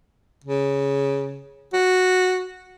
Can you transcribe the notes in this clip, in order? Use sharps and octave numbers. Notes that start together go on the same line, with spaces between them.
C#3
F#4